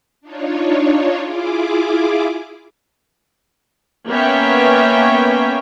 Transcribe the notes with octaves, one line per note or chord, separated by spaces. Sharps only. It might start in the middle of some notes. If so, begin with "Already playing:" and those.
D4 D#4 F4 C#5
E4 F4 G#4 D6
A#3 B3 C#4 C#5 E5 G5